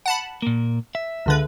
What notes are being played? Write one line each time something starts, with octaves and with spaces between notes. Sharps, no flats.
F#5 A5 B5
A#2 A#3
E5
C#2 D3 B4